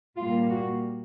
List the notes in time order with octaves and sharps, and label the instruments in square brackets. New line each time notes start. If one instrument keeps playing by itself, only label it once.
[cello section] A#2 G3 A#3 F4
F#4